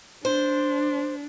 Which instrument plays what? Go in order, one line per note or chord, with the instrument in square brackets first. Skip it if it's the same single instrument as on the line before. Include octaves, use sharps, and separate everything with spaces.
[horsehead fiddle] D4 [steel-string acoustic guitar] C5